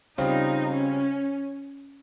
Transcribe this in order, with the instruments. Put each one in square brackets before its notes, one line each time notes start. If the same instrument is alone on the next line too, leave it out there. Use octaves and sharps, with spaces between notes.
[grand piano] C#3 G3 C4 F4 [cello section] D#4
[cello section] C#4